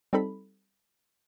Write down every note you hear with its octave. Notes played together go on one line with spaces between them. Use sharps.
G3 C4 D#4 A4 B5